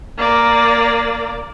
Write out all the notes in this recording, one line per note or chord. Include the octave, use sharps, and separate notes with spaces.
A#3 D5